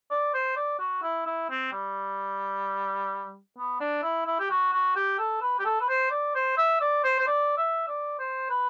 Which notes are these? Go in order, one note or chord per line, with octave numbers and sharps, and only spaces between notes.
D5
C5
D5
F#4
E4
E4
C4
G3
B3
D4
E4
E4
G4
F#4
F#4
G4
A4
B4
G4
A4
B4
C5
D5
C5
E5
D5
C5
C5
D5
E5
D5
C5
B4